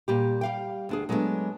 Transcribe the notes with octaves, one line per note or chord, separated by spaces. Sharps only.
A#2 G3 G4
G3 F5 G5
D2 D4 G#4
F#3 G#3 A3 B3 D4